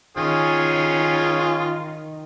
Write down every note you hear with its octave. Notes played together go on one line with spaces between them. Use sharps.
D#3 C#4 F4 G#4